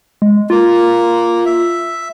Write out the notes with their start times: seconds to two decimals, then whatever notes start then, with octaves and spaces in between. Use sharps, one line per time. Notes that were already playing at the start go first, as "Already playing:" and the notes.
0.22 G#3
0.50 A#3 F4
1.45 E5